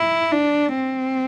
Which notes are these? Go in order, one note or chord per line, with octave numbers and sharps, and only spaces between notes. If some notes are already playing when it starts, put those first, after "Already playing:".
Already playing: E4
D4
C4